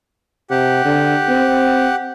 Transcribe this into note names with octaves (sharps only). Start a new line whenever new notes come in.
C3 G4 F#5
D3
C4